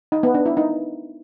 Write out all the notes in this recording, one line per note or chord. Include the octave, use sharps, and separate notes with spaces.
D#4
B3
D4
E4
D#4